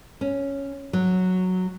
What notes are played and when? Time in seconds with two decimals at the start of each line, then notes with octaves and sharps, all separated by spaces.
0.21 C#4
0.93 F#3